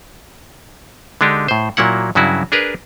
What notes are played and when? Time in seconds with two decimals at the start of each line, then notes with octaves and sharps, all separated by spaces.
1.21 D3 G#3 D4 D#4 G4
1.48 A2 C5
1.77 A#2 F#3 A#3 E4 F#5
2.15 G2 C#3 F#3 E4 F#4
2.52 D4 G#4 A#4 B4